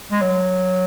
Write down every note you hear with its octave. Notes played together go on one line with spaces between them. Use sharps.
G#3
F#3